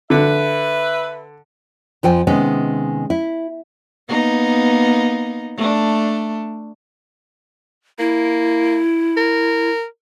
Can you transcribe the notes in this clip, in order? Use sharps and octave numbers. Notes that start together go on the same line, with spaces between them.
D3 B4 E5
F2 F3 C5 G5 G#5
C3 D#3 G#3 B3 C#4
E4
A#3 B3 D#4
A3 D4
A#3 E4
A#4